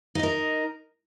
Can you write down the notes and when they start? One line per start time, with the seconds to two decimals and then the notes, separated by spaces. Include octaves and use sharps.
0.15 D#4
0.19 D#5
0.23 A#4